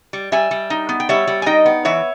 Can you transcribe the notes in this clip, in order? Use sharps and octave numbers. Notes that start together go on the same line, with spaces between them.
G3
G3 E5 G#5
G3
D#4
B3
G5
G3 C#5 E5
G3
G#5
D#4 D#5 G5
B3
E3 C#5 E5